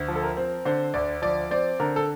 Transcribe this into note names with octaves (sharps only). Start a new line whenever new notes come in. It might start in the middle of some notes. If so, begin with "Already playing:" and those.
Already playing: D2
F3
A4
A#4
C4
D3 C5
D2 D5
F3 D5
C4 D5
D3 A#4
A4